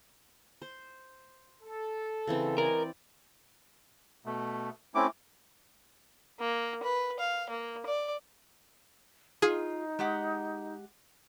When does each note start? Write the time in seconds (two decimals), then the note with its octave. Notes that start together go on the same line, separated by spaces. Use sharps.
0.62 C5
1.63 A4
2.27 C#3 E3 C4
2.58 C#2 A#4 D5 D#5 G#5
4.26 B2 A3
4.95 A3 C4 C#4 E4 D6
6.40 A#3
6.84 B4
7.20 F5
7.50 A#3
7.86 D5
9.42 D#4 F4 G#4
9.99 G#3 G4 F#5